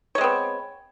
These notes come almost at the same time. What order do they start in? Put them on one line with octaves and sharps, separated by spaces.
C#5 G#3 C4 B3